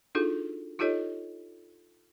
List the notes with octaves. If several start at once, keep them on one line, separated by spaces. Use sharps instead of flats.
D4 D#4 F4 F#4 G#4 A4
D#4 F4 G4 A4 C#5 D#5